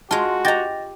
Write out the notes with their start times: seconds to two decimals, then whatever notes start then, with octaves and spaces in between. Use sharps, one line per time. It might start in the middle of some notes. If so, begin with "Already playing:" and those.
0.11 G#3 F4 F#4 A5
0.45 G4 D#5 A#5 A6 A#6